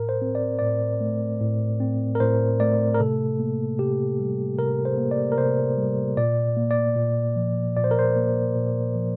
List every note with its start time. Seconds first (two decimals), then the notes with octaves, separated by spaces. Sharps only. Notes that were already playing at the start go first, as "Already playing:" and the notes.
Already playing: A2 A#4
0.09 C5
0.22 C4
0.35 D5
0.59 A2 D5
1.01 A3
1.41 A2
1.80 C4
2.15 A#4
2.20 A2 C5
2.60 A3 D5
2.94 A#4
3.00 C3 A4
3.39 A#3
3.79 C3 G4
4.19 G3
4.58 C3 A#4
4.85 C5
4.98 A#3
5.11 D5
5.32 A#4
5.38 C3 C5
5.77 G3
6.17 A#2 D5
6.57 A#3
6.71 D5
6.96 A#2
7.36 F3
7.76 A#2 D5
7.84 C5
7.91 A#4
7.99 C5
8.16 A#3
8.55 A#2
8.96 F3